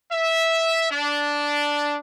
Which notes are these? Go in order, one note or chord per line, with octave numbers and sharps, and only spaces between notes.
E5
D4